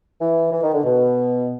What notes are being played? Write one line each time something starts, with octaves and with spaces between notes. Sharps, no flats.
E3
E3
D#3
D3
B2